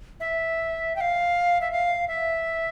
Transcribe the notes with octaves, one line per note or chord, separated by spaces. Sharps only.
E5
G5
F5
E5
F5
E5